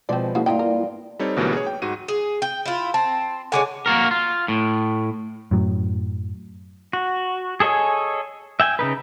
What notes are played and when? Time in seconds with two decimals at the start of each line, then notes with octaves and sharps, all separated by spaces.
0.09 B2 F3 G#3 C4 D5
0.35 C#3 A#3 E4 F#4 F5
0.46 G2 A3 D#4 F4 D5 G5
0.59 A#4
1.19 G3 C4 D#4 A4 C#5
1.37 D2 B2 E3 F#3 G3 A#3
1.53 G#4 C#5
1.67 G5
1.82 G#2 F#4 D#7
2.08 G#4
2.42 G5
2.65 E4 F4
2.94 C4 A5
3.52 D3 G#3 C#4 F#5 G#5 D6
3.86 A#3 F#4 A#4
4.11 F4
4.48 A2
5.51 F#2 A2 F#3
6.93 F#4
7.60 G#4 A4 C#5 D#5 G#5
8.60 E5 G5 G#5
8.79 C#3 D#4 B4